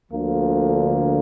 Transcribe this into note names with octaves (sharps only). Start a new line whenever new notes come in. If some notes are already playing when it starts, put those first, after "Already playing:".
D2 D3 F3 A#3